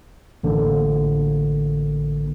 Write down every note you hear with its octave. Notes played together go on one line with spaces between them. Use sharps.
A1 D3 A#3